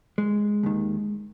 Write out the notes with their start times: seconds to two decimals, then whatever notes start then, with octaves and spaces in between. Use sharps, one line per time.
0.18 G#3
0.63 D#2 D#3